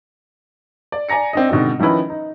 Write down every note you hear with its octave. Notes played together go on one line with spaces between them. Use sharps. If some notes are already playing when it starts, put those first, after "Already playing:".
D5
D5 G#5 A#5 A#6 C#7
C4 D4 D#5
G#2 B2 D3 D#3 C4
D#3 F3 C#4 D#4 E4 B4
D#4